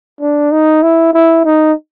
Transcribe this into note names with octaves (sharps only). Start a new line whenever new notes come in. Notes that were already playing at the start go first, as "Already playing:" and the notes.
D4
D#4
E4
E4
D#4